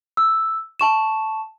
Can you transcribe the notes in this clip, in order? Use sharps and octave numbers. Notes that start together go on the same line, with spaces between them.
E6
A5 C#6 E7